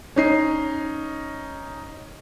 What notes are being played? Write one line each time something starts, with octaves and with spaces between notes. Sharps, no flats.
C#4 D#4 C7